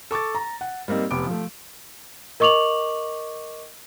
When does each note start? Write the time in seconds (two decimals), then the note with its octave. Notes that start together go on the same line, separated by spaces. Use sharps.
0.11 A4 C#6 D6 A6
0.35 A#5
0.61 F#5
0.88 G3 A#3 C4 D#4
1.11 F1 B3 G4 D6 D7
1.26 F3 A3
2.40 A#4 D#5 C#6 D6 F7 F#7